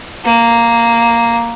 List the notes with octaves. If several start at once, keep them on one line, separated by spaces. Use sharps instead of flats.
A#3